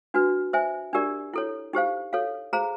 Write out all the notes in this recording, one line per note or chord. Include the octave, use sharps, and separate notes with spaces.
D4 F#4 B4
C5 E5 G#5
D4 G4 A#4 D5
E4 A4 C#5
D#4 G4 C5 F5
A4 C#5 F5
G#4 C5 F5 A#5